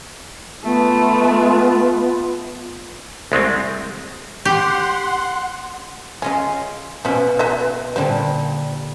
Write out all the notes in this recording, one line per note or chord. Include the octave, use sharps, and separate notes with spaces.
A3 B3 F4
C2 G#3 A3 C4
G4 F#5 C6
C#3 C#4 F4 D#5
B2 F3 C#4
B4 D#5 E5
A#2 D3 G3 C5